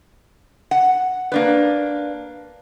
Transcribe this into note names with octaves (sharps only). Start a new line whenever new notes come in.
F#5
A#3 D4 B4